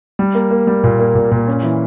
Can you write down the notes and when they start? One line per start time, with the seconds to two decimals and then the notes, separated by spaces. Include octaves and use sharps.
0.19 G3
0.35 A#3
0.51 A#3
0.67 G3
0.84 A#2
1.00 A#3
1.15 A#2
1.32 A#2
1.48 C#4
1.63 E3